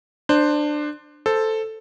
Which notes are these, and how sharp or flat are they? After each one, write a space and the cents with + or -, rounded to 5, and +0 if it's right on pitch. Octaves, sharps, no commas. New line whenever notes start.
D4 +20 C5 +0
A4 +0 C5 +0